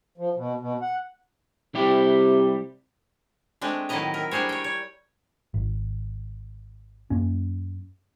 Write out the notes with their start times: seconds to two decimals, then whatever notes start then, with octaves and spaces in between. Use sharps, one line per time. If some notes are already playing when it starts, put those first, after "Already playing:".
0.18 F3
0.36 B2
0.60 B2
0.81 F#5
1.75 C3 G3 E4 G4
3.61 G#3 A3 C4 D4
3.89 A2 D#3 F#3 E4 D#5 A#5
4.14 A#4 E5
4.31 G3 D4 G#4 C5 C#5
4.49 C#5 G5
4.64 C#5
5.54 G#1
7.10 F#2 A#3 C#4